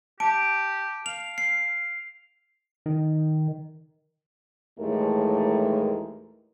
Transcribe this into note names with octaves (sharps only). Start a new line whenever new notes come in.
G4 A5 D7
F5 F7
C7
D#3
D#2 A2 E3 G#3 A3 A#4